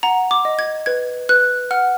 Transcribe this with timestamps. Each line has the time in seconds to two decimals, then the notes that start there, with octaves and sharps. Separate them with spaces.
0.03 F#5 A#5
0.31 D6
0.45 D#5
0.59 G#6
0.86 B4 G#6
1.29 B4 F#6
1.71 F#5 F6